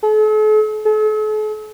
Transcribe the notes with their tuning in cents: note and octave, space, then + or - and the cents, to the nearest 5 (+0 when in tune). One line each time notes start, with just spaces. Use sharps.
A4 -45
A4 -45